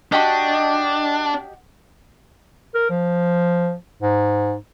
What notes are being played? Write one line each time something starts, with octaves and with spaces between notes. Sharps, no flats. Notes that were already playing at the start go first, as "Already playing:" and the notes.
D4 F#4 G4 D#5
A#4
F3
G#2